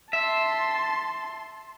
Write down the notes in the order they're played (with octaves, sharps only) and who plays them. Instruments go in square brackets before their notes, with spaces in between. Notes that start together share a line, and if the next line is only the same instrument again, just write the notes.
[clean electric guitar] E5 [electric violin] A5 C6